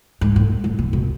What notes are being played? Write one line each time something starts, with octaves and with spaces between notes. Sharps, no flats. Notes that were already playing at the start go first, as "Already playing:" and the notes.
G#2
A2
A2
B2
B2